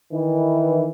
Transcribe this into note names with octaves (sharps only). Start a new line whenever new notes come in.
D#3 E3